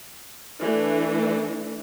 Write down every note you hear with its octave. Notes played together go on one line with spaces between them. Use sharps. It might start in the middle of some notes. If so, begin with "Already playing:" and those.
E3 A3 D4